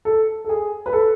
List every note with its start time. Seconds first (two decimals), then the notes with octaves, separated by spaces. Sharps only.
0.05 A4
0.45 A4
0.49 G#4
0.86 B4
0.93 A4